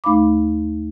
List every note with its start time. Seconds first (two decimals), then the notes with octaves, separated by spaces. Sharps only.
0.04 D#2 A3 D#4 F5 B5 D6